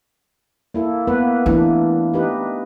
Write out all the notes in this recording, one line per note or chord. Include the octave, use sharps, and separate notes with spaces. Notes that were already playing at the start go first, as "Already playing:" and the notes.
A#3 E4 A4
A#3 B3 B4
E3 A3 A#3 D4 E4
D#4 G4 B4